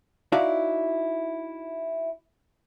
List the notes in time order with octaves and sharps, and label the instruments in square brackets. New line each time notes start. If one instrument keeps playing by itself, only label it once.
[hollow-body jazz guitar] D#4 E4 F#4 D5 E5 F5